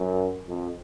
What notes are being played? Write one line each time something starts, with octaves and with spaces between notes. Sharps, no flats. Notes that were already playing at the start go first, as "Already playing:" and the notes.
Already playing: F#2
F2